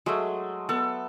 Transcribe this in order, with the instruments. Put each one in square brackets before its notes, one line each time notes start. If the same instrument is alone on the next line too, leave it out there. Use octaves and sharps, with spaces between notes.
[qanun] F#3 [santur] G#3 A3
[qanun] B3 [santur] A4